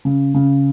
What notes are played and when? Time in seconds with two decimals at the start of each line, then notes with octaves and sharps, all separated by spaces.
0.05 C#3
0.34 C#3